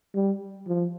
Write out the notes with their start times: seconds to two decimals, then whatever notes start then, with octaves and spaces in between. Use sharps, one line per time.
0.15 G3
0.68 F3